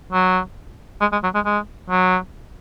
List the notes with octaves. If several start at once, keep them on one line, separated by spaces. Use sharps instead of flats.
F#3
G#3
G#3
F#3
G#3
G#3
F#3